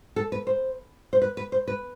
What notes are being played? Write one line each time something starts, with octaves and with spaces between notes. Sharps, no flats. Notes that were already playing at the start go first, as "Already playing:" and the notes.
A4
B4
C5
C5
B4
B4
C5
B4